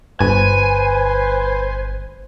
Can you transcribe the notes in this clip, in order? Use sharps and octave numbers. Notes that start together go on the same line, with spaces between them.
G1 B4 C5 G#5